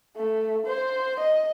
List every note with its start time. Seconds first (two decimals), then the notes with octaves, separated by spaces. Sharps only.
0.16 A3
0.66 C5
1.19 D#5